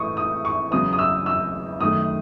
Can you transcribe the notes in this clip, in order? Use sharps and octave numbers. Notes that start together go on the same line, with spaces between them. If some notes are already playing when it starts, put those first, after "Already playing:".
Already playing: A2 E3 A3 C#6 D#6
D#6
C#6
E2 C#3 F#3 D#6
D#6
E6
E6
F#2 D#3 A3 D#6